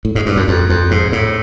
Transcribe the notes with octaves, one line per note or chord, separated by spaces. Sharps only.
A2
G#2
G2
F#2
F2
F2
G#2
A2